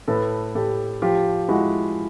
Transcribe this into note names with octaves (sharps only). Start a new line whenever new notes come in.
A2 A4 B4
A2 G4 A4
F3 F4 G4
G#3 E4 F#4